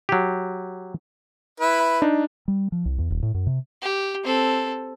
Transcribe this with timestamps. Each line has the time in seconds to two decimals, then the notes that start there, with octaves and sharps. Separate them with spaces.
0.09 F#3 G4
1.60 E4 B4
2.02 D4 D#4
2.48 G3
2.72 F3
2.85 C2
2.98 E2
3.10 D#1
3.22 A2
3.34 F#2
3.47 C3
3.82 G4
4.24 C4 A4